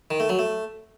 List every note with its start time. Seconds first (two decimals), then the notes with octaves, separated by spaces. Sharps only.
0.11 D#3
0.20 A3
0.29 F#3
0.39 A3